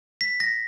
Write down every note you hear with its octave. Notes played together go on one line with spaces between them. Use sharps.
B6
A#6